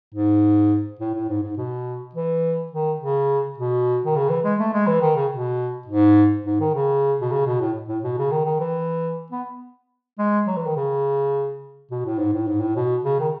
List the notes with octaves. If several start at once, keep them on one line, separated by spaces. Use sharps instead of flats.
G#2
A2
A2
G#2
G#2
B2
E3
D#3
C#3
B2
D#3
C#3
E3
G#3
A3
G#3
E3
D#3
C#3
B2
G#2
G#2
D#3
C#3
B2
C#3
B2
A2
A2
B2
C#3
D#3
D#3
E3
B3
G#3
F#3
E3
D#3
C#3
B2
A2
G#2
A2
G#2
A2
B2
C#3
D#3